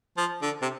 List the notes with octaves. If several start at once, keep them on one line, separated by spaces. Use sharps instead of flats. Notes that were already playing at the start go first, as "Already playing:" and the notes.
F3
D3
C3